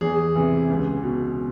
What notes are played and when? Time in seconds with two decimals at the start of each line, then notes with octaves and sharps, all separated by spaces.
0.01 E2 G#4
0.35 C3 E3
0.70 C#2
1.03 B2